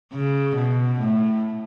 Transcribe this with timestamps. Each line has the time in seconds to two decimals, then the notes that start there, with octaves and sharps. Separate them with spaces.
0.13 C#3
0.56 B2
1.00 A2